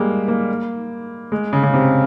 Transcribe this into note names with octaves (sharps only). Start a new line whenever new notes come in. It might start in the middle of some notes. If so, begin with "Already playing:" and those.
Already playing: G3 G#3 A#3
A#3
G#3
C#3
C#3
C3